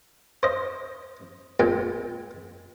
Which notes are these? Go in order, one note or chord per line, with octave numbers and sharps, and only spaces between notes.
C5 D#5
A#2 G#3 G5